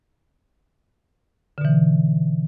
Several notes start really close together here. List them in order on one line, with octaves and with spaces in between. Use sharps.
D3 B2 E3